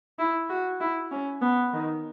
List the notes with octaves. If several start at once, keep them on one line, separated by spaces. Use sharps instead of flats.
E4
F#4
E4
C#4
B3
D#3